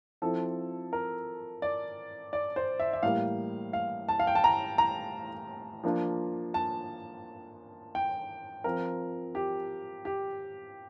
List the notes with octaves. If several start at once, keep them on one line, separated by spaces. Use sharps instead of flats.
F3 C4 E4 A4
A#4
D5
D5
C5
E5
E5
A2 E3 G3 A#3 F5
F5
A5
F5
G5
A5
A#5
A#5
F3 A#3 D4 F4
A5
G5
F3 C4 F4 A#4
G4
G4